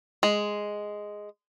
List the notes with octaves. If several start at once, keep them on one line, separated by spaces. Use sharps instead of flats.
G#3